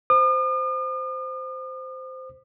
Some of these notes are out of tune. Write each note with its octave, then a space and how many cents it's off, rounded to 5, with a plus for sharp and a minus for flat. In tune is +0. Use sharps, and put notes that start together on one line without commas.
C5 -10 D#6 -45